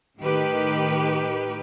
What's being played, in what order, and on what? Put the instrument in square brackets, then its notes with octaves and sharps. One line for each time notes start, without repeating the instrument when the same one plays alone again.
[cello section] A2 D#3 G4 B4